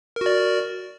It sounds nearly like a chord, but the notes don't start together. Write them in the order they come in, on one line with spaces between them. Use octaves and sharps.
A#4 F#4 D5